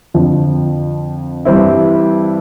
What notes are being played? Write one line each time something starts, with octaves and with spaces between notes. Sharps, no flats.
F2 D3 F3
G2 E3 G3 C4 E4